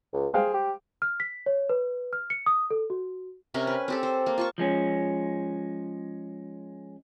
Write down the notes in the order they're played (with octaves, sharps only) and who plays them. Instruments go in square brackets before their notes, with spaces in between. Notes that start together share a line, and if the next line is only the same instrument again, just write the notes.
[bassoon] C#2
[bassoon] G#4 [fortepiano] C5 F5 G5
[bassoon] G4
[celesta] F6
B6
C#5
B4
F6
C#7
D#6
A4
F#4
[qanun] C3 C#4 A#4 G#5
B4
C4 G4 A4
C5
A#3
F4 A5 C#6
[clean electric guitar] F3 G#3 C#4